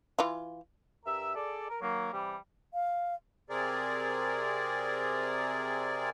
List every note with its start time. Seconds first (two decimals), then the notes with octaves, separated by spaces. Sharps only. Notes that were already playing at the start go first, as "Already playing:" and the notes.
0.19 E3 F4
1.06 G2 A#4 E5
1.36 G#4 A4 D5
1.70 A#4
1.81 D#3 F#3 A#3
2.13 C3 E3 G3
2.74 F5
3.50 C3 C4 G#4 A#4 D5